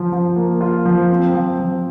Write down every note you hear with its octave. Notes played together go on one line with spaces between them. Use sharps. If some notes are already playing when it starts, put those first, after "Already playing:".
Already playing: F3 F4
F3
A#3
F4
F3
C4
F3
F3